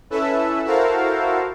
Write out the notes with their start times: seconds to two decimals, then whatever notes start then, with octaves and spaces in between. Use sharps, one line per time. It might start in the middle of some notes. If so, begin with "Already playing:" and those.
0.10 C#4 E4 A4 B4 E5
0.64 E4 F#4 A4 A#4 C5 F5